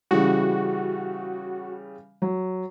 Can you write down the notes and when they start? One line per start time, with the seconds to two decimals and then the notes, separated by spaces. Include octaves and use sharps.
0.11 C#3 E3 G3 F#4
2.22 F#3